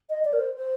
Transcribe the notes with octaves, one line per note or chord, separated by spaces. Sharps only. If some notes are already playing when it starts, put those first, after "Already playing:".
D#5
D5
A#4
C5
C5